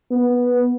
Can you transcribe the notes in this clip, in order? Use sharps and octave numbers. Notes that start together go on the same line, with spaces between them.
B3